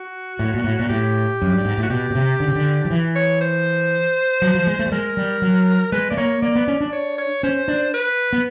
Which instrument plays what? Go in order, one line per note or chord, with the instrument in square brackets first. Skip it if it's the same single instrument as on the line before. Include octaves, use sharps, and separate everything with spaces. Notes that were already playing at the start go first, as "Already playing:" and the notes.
Already playing: [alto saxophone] F#4
[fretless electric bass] A2
A#2
A2
A#2
[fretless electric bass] A2 [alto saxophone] G4
[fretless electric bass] F#2
G2
G#2
A2
[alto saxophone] F#4
[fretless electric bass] B2 [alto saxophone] G4
[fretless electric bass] B2
C3
D3
C#3
D3
F3
E3
[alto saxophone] C#5
C5
[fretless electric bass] F#3
F3
G#3
A3
G3
[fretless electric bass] G#3 [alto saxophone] A#4
[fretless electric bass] G3
F#3
[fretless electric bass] G#3 [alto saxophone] B4
[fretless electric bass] A3 [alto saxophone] D5
[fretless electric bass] A#3 [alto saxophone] C#5
[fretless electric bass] A#3 [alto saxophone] D5
[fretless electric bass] B3
C#4
D4
[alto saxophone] C#5
C#5
[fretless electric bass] C#4 [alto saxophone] C5
[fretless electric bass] D4
[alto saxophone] B4
[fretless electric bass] B3